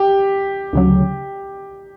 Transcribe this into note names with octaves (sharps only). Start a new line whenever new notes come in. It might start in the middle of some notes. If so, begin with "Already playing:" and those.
Already playing: G4
D2 C#3 F#3